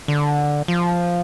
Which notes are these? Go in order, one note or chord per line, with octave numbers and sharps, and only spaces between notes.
D3
F3